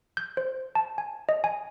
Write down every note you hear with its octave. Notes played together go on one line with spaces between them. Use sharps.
G6
C5
A5
G#5
D#5
G#5